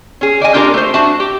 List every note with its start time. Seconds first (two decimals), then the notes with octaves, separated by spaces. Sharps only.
0.21 C#4 G#4
0.40 D#3 D5 D#5 G#5
0.54 A#3 D4 F4 G4 A4 A#4
0.74 A3 C5
0.94 D4 F#4 E5 A5
1.20 G4